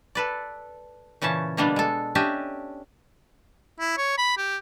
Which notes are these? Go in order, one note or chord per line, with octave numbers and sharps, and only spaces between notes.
A4 B4 D5
A#2 C#3 E3 C#4 A5
B2 D3 G3 A#3 B3 D4
G#3 A4
C#4 D4 G4 D#5 E5
E4
C#5
B5
G4